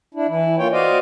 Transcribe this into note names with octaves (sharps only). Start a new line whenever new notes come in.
D4 E4
E3 E4
A#3 F4 C#5 G5
F#4 C5 D5 D#5 F5